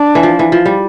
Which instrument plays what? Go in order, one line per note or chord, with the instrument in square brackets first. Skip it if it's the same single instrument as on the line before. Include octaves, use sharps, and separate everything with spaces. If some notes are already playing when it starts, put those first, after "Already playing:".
Already playing: [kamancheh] D4
[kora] E3
F3
E3
F3
G3